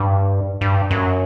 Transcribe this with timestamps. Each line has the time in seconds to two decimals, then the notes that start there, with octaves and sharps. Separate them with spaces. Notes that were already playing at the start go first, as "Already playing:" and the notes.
Already playing: G2
0.61 G2
0.91 F#2